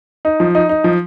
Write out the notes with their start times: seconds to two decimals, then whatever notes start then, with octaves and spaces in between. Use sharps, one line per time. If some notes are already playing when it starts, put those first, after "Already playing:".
0.25 D#4
0.40 F3
0.55 D#4
0.69 D#4
0.84 F3